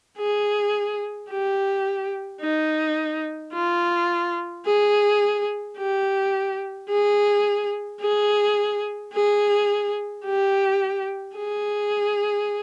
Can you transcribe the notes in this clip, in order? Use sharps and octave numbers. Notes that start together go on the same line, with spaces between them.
G#4
G4
D#4
F4
G#4
G4
G#4
G#4
G#4
G4
G#4